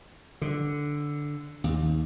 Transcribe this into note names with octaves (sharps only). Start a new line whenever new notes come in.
D3
D#2